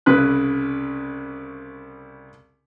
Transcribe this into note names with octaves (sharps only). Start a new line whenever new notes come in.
C2 C#3 B4 F#6